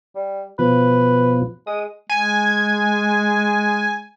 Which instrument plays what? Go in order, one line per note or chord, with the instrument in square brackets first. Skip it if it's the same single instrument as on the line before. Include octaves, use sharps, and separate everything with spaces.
[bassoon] G3
[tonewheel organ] B2 F3 [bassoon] B4
[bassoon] G#3 [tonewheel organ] D#6
[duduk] G#3 [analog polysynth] G#5